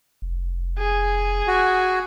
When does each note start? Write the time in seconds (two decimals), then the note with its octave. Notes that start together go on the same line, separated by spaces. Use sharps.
0.22 F1
0.79 G#4
1.47 F#4